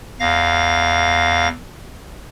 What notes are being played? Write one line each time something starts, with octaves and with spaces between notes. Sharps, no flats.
E2 F5 A#6